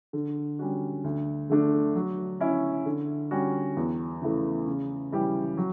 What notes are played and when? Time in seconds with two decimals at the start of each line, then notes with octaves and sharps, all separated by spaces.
0.13 D3
0.59 G3 C#4 F#4
1.04 D2
1.50 D3 A3 D4
1.95 F#3
2.40 C#4 E4
2.86 D3
3.31 G3 C#4 F#4
3.77 E2
4.22 C#3 E3 A3
4.67 C#3
5.12 E3 G3 C#4 G4
5.57 F#3